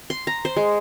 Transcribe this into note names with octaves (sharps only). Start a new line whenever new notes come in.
C6
A#5
C5
G#3